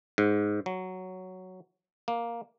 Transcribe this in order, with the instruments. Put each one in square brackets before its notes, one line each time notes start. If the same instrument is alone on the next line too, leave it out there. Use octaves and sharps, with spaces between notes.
[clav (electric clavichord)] G#2
F#3
A#3